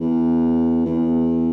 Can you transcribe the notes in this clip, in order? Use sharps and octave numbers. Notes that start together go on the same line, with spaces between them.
E2
E2